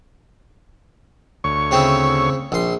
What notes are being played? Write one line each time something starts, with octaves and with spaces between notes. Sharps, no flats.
D2 C#5 C#6
C#3 C4 E4
A#1 C6